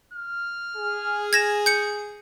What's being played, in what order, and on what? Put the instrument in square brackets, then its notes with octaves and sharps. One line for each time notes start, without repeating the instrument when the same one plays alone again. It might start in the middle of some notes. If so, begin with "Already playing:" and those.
[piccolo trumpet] F6
[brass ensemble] G#4
[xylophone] G#6 A#6 E7
G6 C#7